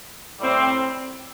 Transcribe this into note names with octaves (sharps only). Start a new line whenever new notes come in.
A2 G3 C4